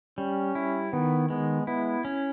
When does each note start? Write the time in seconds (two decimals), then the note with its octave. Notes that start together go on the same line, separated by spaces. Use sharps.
0.18 G3 C#4
0.55 E4
0.93 D#3 B3
1.30 G#3 B3
1.67 B3 E4
2.05 C#4